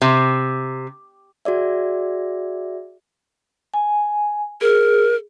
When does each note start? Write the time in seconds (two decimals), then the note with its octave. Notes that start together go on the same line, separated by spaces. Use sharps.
0.02 C3
1.45 F#4 G#4 D5 E5
3.74 G#5
4.61 G#4 A#4